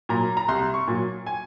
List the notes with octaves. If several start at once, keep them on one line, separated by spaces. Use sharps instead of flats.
A#2 F#3 A#5
A#5
C2 C6
C#6
A#2 F#3
G#5